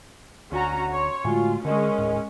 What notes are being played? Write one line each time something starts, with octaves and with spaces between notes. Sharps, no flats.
D2 C#4 F#4 A#5
C#5 C6 C#6
A2 D3 G#3 A3 F4 F#4 G#5
D3 G#3 C#4 A#4 D#5
D#1 A2